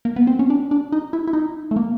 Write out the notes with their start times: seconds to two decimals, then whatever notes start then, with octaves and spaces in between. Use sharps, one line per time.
0.05 A#3
0.16 B3
0.27 C4
0.39 C#4
0.50 D4
0.71 D4
0.92 D#4
1.13 E4
1.27 E4
1.33 D#4
1.71 A3
1.76 A#3